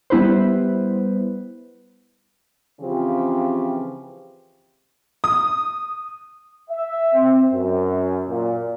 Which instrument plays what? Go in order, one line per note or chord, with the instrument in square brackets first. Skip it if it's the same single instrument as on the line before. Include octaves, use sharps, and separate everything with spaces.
[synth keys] G3 B3 E4 B4 C5
[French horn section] C#3 E3 F3 C4 F4 G4
[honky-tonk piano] D#6
[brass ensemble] E5
C4
F#2
A#2